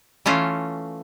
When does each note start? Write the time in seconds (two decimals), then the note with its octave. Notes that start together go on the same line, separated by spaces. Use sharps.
0.26 E3 A3 C#4 F4